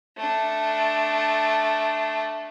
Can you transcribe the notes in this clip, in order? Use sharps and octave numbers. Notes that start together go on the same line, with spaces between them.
A3 D4